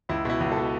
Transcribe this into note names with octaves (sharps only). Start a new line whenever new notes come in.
C#2 E4
B2 E4
C#2
A4
B2